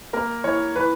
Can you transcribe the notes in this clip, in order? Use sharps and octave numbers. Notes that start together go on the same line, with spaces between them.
A#3 A#4
E3 C#5
E3 B4